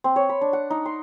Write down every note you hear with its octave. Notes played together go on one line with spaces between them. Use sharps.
C4
C#5
B5
D4
F#5
D#4
C6